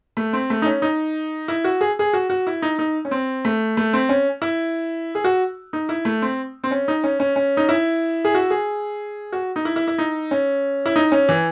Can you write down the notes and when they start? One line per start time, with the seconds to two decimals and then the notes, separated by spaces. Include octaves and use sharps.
0.17 A3
0.33 C4
0.50 A3
0.62 D#4
0.66 C#4
0.82 D#4
1.48 E4
1.64 F#4
1.81 G#4
1.99 G#4
2.13 F#4
2.30 F#4
2.47 E4
2.62 D#4
2.79 D#4
3.05 C#4
3.11 C4
3.45 A3
3.77 A3
3.93 C4
4.09 C#4
4.42 E4
5.15 G#4
5.24 F#4
5.73 D#4
5.89 E4
6.05 A3
6.22 C4
6.64 C4
6.71 C#4
6.88 D#4
7.04 C#4
7.20 C#4
7.36 C#4
7.57 D#4
7.69 E4
8.25 G#4
8.35 F#4
8.50 G#4
9.32 F#4
9.56 D#4
9.65 E4
9.76 E4
9.88 E4
9.98 D#4
10.31 C#4
10.86 E4
10.96 D#4
11.12 C#4
11.29 E3